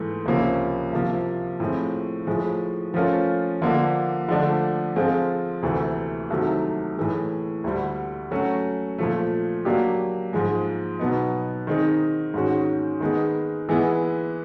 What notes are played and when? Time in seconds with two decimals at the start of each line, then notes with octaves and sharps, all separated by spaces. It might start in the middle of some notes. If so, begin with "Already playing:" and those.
Already playing: G#2 E3 A3
0.26 C#2 C3 F3 A#3 C#4
0.93 C2 C3 F3 A#3
1.60 A2 F3 G#3 C4
2.27 A2 F3 G#3
2.94 F3 A3 C#4 F4 A#4
3.62 D3 F3 A#3 D4
4.29 D3 F3 A3 D4
4.96 F3 G#3 C4 F4 A4
5.62 D2 C3 E3 A3
6.30 C2 C3 D#3 F#3 A3
6.97 A2 E3 G#3
7.64 D2 D3 G3
8.31 F#3 A3 C#4 F#4
8.98 A#2 F3 A3
9.65 F#3 A#3 D4 G4
10.33 G#2 F3 G#3
10.99 B2 F#3 B3 D#4
11.67 D#3 G#3 C4 D#4
12.34 G#2 D#3 G#3 C#4 F#4
13.00 D#3 G#3 B3 D#4 G#4
13.69 E3 G#3 B3 E4